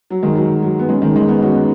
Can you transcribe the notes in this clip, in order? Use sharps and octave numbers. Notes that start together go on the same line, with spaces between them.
F#3
D#3 G#3
F#3
F#3
B3
G#3 C#4
D#3 G#3
D#3 G#3
B3 D#4
C#4 F#4
B3 D#4